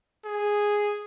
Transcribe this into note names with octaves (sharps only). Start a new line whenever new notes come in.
G#4